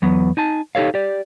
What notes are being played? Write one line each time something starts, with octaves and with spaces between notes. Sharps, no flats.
E2 F#3 B3
D#4 G#5 A5
D#4 G4 A4 C#5 F5
G4 D5